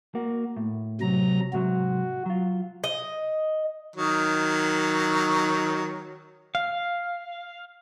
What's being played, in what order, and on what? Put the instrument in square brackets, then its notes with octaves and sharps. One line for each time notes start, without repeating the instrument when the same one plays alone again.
[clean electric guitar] A#3 F#4
A2
[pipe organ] C3 F#3 A#5
[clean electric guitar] G#2 C3 F#3 [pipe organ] F#4
[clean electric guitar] F#3 F4
[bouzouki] D#5
[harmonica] D#3 F#3
[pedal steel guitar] F5